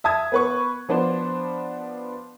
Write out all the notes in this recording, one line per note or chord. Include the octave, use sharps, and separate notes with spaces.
E5 A5 D#6 G#6
B3 B4 C#6
F3 B3 D4 C5